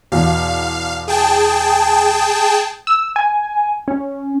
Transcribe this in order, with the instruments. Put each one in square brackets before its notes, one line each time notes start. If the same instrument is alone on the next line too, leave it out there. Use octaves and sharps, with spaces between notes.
[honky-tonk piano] E2 B2 [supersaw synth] F5
[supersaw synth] G#4 G5 A5
[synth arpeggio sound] E6
G#5
C#4